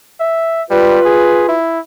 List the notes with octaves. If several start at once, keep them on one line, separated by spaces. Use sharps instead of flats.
E5
G3 F4 B4
G#4
E4